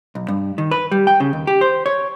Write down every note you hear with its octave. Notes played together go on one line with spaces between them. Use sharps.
B1
G2
D#3
B4
G3
G5
C#3
D#2
G4
C5
C#5